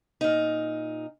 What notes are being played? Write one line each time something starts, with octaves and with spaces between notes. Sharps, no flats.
A#2 D#4